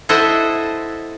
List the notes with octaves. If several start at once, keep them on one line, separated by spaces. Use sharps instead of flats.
E4 A4 C5 D#5 E5 F#5